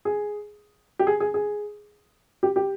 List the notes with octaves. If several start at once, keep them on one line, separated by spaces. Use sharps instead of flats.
G#4
G4
G#4
G#4
G#4
G4
G4